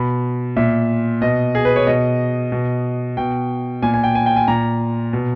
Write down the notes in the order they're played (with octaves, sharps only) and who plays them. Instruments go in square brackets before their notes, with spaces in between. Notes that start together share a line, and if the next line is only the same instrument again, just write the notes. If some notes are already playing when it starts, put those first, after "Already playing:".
Already playing: [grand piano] B2 B5
A#2 E5
B2 D#5
G#4
B4
C#5
B2 D#5
B2
B2 G5
A#2 G#5
G#5
G5
G#5
G5
G#5
A#2 A#5
B2